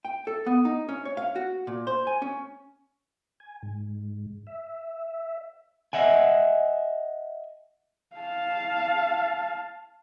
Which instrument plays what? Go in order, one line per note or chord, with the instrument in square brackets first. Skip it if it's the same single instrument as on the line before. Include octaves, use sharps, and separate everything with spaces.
[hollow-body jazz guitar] G5
A4
B3
D#4
C#4
C#5
F5
F#4
A#2
C5
G#5
C#4
[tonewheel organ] G#5
G#2
E5
[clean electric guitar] D#5 E5 F#5 G#5
[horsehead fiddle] F5 A5